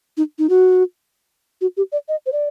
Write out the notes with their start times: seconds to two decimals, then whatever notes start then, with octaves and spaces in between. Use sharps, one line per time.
0.17 D#4
0.39 D#4
0.49 F#4
1.61 F#4
1.77 G4
1.92 D5
2.08 D#5
2.26 C5
2.32 D5